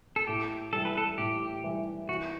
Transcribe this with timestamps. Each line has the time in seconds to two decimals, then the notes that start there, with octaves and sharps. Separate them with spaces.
0.16 A4
0.27 A2 G4
0.73 E3 G3 A4
0.85 B4
0.97 A4
1.18 A2 G4
1.64 E3 G3
2.08 E3 F#4